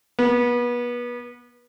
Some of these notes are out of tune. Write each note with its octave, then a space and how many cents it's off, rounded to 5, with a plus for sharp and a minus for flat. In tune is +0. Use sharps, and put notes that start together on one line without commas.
B3 -30